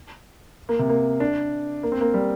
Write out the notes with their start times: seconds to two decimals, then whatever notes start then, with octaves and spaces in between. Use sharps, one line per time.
0.69 A#3
0.79 C3
0.89 A#3
1.20 D4
1.83 A#3
1.92 C4
2.01 A#3
2.14 G3